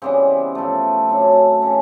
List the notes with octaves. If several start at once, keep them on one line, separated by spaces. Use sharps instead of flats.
C#3 E3 G3 B3 C4
A2 F3 A3
F#2 D3 F#3 C4
C#4
C4
C#3 E3 C#4